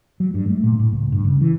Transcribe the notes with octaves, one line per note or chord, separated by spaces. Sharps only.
F#3
G2
A3
A#2
A2
C#2
G2
C#3
E3